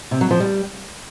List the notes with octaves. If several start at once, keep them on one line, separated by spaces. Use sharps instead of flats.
C3
F#3
F3
G3